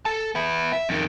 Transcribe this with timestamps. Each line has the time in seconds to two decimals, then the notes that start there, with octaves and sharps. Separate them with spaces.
0.05 A4 A5
0.35 B3 E4
0.73 E5
0.89 F2 D#3